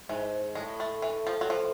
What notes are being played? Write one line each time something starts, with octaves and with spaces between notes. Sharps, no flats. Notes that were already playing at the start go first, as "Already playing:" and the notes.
G#2 E3
A2 G#3
A3
E3
F3
F#3
F3